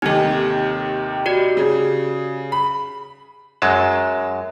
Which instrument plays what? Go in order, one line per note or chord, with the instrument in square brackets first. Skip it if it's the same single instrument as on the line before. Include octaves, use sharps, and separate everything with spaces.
[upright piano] D#2 C3 D#3 [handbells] D#4 A4
[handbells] F#4 G4 D5
[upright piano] C#3
B5
[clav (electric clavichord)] F#2 F#3 G#3 A5